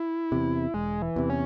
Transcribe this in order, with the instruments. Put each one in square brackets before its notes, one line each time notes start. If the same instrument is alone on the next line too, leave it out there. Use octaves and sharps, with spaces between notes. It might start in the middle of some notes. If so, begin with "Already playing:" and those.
Already playing: [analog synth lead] E4
[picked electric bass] E2 C3
[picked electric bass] E1 [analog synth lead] G#3
[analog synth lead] E3
[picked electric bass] E2 C3
[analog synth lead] C#4